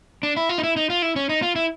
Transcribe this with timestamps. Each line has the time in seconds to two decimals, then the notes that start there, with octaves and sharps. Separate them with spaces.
0.23 D4
0.37 E4
0.49 F4
0.58 D#4
0.63 E4
0.77 D#4
0.90 F4
1.02 E4
1.16 C#4
1.29 D#4
1.42 F4
1.56 E4